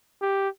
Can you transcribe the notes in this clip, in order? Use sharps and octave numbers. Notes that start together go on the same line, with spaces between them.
G4